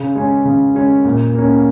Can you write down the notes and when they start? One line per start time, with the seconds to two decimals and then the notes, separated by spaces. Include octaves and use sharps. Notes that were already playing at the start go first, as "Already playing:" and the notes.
Already playing: C#3
0.15 G#3 C#4
0.45 C#3
0.75 G#3 C#4
1.05 A#2
1.35 A#3 C#4